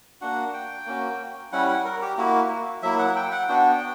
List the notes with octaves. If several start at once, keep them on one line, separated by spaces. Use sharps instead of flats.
A#3 D4 F#4 F#5
G5
A#3 C#4 F#4
G3 C#4 E4 F#5
F#5
A#4
G4
A#3 E4 F#4
F#3 A#3 E4 E5
F#5
G5
F#5
B3 D4 F#4 G5